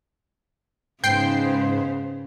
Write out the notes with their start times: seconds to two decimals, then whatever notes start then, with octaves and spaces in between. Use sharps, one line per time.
1.04 G#2 C#3 B3 C5 G5 C7